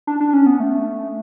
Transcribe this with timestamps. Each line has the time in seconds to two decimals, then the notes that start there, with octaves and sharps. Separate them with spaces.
0.07 D4
0.20 D4
0.33 C#4
0.46 B3
0.60 A3